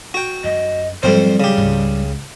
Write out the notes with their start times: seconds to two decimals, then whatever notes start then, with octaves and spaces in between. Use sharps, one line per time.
0.14 F#4 G5
0.44 F#2 D#5
1.03 F2 G#2 F#3 G3 C4 C5
1.40 C#3 G4
1.57 C#2 G#2